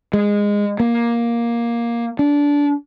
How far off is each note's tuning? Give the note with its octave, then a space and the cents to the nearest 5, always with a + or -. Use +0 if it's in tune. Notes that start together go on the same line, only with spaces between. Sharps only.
G#3 -15
A#3 +10
D4 -20